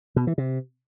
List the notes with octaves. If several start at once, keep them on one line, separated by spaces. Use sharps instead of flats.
B2
E3
C3